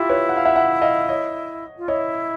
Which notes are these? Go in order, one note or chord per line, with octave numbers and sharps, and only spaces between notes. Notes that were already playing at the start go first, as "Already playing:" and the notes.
Already playing: E4 F4 G4
B4 C#5
F#5
F5
E5 F#5
E5 F#5
D#5 F5
C#5 D#5
F4
E4 C#5 D#5